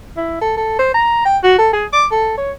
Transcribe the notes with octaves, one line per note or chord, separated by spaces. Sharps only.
E4
A4
A4
C5
A#5
G5
F#4
A4
G#4
D6
A4
C#5